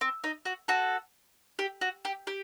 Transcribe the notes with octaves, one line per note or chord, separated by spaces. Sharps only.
C4
D#4
F#4
F#4 A4
G4
F#4
G4
G4